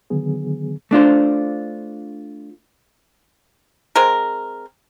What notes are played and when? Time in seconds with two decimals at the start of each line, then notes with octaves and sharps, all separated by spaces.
0.10 D3 D#3 F#3 B3 G#4
0.91 A3 D4 F4 C5
3.96 G#3 C4 A#4